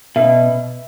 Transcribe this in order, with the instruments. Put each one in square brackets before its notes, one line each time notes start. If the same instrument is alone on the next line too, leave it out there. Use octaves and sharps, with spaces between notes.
[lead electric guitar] B2 [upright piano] E5